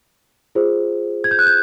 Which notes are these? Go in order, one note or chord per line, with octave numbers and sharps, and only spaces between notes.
F4 G#4 C5
G#6
G6
F#6
G6